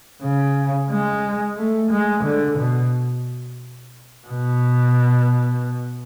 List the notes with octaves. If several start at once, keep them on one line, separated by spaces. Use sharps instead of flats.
C#3
G#3
A3
G#3
D3
B2
B2